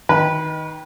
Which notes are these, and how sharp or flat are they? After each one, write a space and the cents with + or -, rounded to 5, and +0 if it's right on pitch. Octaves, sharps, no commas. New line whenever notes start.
D#3 +10 B4 -25